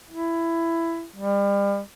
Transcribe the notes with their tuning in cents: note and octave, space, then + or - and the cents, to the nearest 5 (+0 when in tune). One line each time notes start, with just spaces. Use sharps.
E4 +15
G3 +35